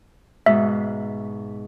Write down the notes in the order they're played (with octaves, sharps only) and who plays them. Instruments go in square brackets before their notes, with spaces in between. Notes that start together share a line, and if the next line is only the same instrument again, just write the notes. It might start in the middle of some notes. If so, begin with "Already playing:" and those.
[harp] G#2 B2 G#3 [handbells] E5